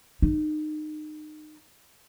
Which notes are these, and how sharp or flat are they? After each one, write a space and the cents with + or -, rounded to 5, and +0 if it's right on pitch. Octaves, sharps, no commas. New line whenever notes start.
D#4 -30